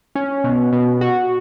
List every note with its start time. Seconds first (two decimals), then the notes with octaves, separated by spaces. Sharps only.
0.15 C#4
0.44 B2
0.73 B2
1.01 F#4